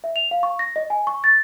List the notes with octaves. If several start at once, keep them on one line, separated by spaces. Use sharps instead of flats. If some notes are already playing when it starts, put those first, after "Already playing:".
E5
F7
F5
C#6
A#6
D#5
G#5
C#6
A6